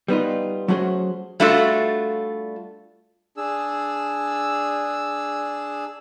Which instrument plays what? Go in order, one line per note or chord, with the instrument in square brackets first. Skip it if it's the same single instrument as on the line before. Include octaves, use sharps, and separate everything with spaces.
[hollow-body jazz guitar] G3 B3 D#4 F4
F#3 A3 C#4 F#4 G#4 C5
[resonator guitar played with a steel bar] G3 A3 D4 F4 F#4 A4
[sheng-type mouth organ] D4 G#4 E6